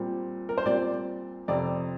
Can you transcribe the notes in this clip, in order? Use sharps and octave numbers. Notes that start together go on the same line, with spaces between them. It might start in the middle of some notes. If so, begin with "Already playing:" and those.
Already playing: A#2 G3 C4
A#4
C5
A#2 G3 C4 D5
F2 C3 F3 C4 D5